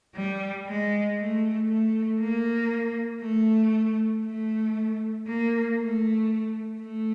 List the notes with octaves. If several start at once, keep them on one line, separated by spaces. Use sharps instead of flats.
G3
G#3
A3
A3
A#3
A3
A3
A#3
A3
A3